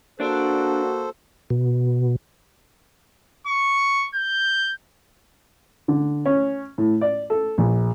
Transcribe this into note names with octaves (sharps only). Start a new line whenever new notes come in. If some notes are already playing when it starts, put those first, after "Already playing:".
A#3 D4 F#4 A4 C5 D5
B2
C#6
G6
D3
C#4
A2
D5
A4
A#1